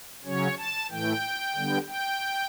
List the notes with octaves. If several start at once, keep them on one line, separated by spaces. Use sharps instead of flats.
C#3 F#3 C#4 C#5
A5
A2 E3 A3 G5
D3 G3 B3
G5